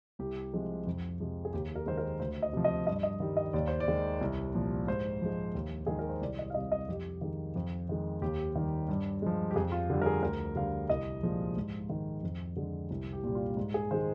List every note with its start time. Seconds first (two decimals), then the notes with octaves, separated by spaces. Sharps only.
0.19 C2 G4
0.53 C3 F3 G#3
0.87 F2
1.20 C3 F3 G#3
1.45 G#4
1.53 D#2 G4
1.76 A#4
1.86 D#3 G#3 C5
1.97 A#4
2.20 D2 C5
2.42 D#5
2.53 C3 F3
2.64 D#5
2.87 G2 D#5
3.03 D#5
3.20 D#3 G3
3.37 D#5
3.53 D#2 D5
3.67 C5
3.80 D5
3.88 D#3 G#3
4.21 C2
4.54 A#2 F3
4.87 G#2 C5
5.22 F3 G#3
5.55 D#2
5.86 D#3 G#3 G#4
5.99 A#4
6.09 C5
6.21 C2 D5
6.39 D#5
6.50 F5
6.54 C3 G3 D#5
6.72 D#5
6.88 F2 G4
7.21 D#3 G#3
7.56 F2
7.89 D#3 G#3
8.22 D#2 G4
8.56 D#3 G3
8.89 G2
9.22 F3 G#3
9.51 G4
9.55 F2 G#4
9.72 F4
9.90 D3 G3
10.02 A#4
10.06 G#4
10.23 D2 A#4
10.55 D3 G3 F5
10.90 C2 D#5
11.23 A#2 F3 G#3
11.57 G#2
11.89 D#3 G#3
12.23 F2
12.56 D3 G#3
12.90 C2
13.13 G4
13.24 A#2 G3
13.35 F4
13.57 G#2
13.74 G#4
13.91 D#3 G#3 C5